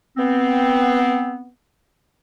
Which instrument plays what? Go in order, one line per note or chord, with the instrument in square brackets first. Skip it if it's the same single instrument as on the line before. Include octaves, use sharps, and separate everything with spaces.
[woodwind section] B3 C4